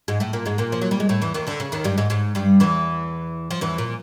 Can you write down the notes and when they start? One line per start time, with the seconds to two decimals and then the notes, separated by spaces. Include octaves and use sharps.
0.08 G#2 G#3
0.20 A2 A3
0.33 A#2 A#3
0.46 G#2 G#3
0.58 A#2 A#3
0.72 F3
0.81 F#3
0.91 G3
1.00 G#3
1.09 A2 A3
1.21 E2 E3
1.34 D#2 D#3
1.47 D2 D3
1.60 C#3
1.72 D#2 D#3
1.84 G2 G3
1.97 G#2 G#3
2.10 G#2 G#3
2.35 G2 G3
2.60 E2 E3
3.51 F3
3.61 E2 E3
3.78 A#2